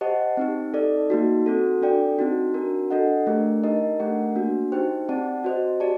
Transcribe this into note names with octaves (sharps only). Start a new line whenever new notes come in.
G4 C5 D#5 F#5 A5
C4 D#4 G4
D#4 A4 D5
A#3 D#4 F#4
C4 F#4 A4
D4 A4 D5 G5
C4 D#4 F#4
D4 F#4 A#4
D4 A4 D#5 F#5
A3 D4 G4 A#4
D#4 G4 A#4 D#5
A3 D4 G4 A#4 F#5
A#3 D4 F#4
D#4 G4 C5 G5
C4 G4 D5 F#5 A5
F#4 C5 D#5
G4 D5 A5